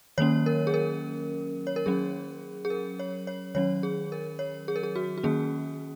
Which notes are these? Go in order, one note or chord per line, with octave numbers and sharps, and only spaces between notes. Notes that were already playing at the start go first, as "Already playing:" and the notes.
D#3 F#3 A#3 C#4 C#5
A#4
G#4
A#4
C#5
A#4
F#3 C#4 G#4
G#4
A#4
C#5
C#5
D#3 F#3 C#4 C#5
G#4
A#4
C#5
G#4
A#4
G#4
F#4
F#4
D#3 A#3 C#4 G#4